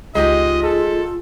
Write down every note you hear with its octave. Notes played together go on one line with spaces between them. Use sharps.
C#2 G#3 D#4 F4 G4 D#5
G#4 A4